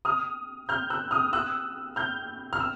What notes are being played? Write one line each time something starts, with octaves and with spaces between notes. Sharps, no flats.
D#6 F6
F6 G6
E6 F#6
D#6 F6
E6 F#6
F6 G6
F6
E6